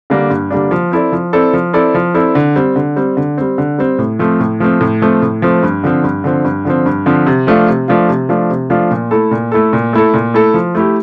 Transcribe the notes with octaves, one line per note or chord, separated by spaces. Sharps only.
D3 G3 A#3 D4
G2
D3 G3 A#3 D4
F3
C4 E4 A4 D5
F3
C4 E4 A4 D5
F3
C4 E4 A4 D5
F3
C4 E4 A4 D5
D3
G3 C4
D3
G3 C4
D3
G3 C4
D3
G3 C4
A2
F3 A3 C4
A2
F3 A3 C4
A2
F3 A3 C4
A2
F3 A3 C4
G2
D3 F3 C4
G2
D3 F3 C4
G2
D3 F3 C4
G2
D3 F3 C4
C3
F3 A3 D4 F4
C3
F3 A3 D4 F4
C3
F3 A3 D4 F4
C3
F3 A3 D4 F4
A#2
A3 E4 A4
A#2
A3 E4 A4
A#2
A3 E4 A4
A#2
A3 E4 A4
F3
A3 E4 G4